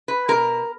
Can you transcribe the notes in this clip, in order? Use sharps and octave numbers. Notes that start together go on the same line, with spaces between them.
B4
B2 G#3 A#4